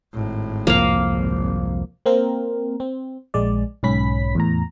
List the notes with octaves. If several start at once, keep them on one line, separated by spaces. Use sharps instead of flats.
G#1 A2
C2 F2 F3 A#3 F5
G#1
A#3 C4 A#4
C4
A#1 G#3 D5
B1 G#2 C#4 B5 B6
E2 A2 A#5